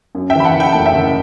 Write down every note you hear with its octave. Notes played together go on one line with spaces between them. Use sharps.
F#2
E5 G5
E3 B5
F#5 A5
F#1
G5
A3 A5
E5 G5
F#1